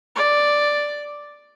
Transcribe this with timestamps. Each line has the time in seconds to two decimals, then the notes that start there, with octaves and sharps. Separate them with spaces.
0.16 D5